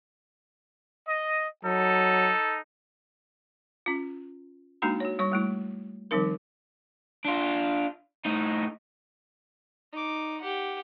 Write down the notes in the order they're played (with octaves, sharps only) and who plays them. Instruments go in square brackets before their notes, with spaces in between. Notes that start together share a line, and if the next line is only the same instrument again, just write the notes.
[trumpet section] D#5
[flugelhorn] F#3 [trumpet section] D#4 A4
[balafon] C#4 F4
G#3 A#3 D4 D#4 F#4 A#5
F#4 C#5
G3 C#5 C#6
G3 A3 E4
D#3 F3 G3 C4 D#4 A#4
[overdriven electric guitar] D4 F4
A2 D#4
[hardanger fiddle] D#4 D6
G4 F#5